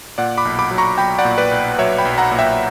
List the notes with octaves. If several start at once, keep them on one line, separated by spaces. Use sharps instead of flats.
A#2 D5 F#5
B5 D6
B1
B5 D6
F#3
A#5 C#6
B1 G5 B5
D5 F#5
A#2
B4 D5
B1
F#3 C#5 E5
G5 B5
B1
F#5 A#5
A#2
E5 G5